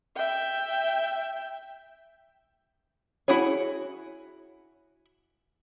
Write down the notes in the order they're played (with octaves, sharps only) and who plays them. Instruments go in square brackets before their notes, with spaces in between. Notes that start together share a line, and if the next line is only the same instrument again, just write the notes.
[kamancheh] E5 G5
[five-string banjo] E4 F#4 G#4 C#5